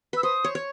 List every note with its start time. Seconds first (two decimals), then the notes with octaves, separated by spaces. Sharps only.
0.13 B4 E6
0.23 C5 D#6
0.44 C#5
0.55 C#5